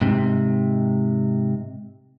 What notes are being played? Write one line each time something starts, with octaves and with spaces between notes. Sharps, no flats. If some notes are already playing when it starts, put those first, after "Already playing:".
G#2 C3